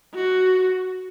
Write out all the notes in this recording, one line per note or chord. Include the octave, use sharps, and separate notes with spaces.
F#4